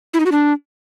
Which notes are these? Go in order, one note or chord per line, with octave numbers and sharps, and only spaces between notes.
E4
D#4
F#4
D4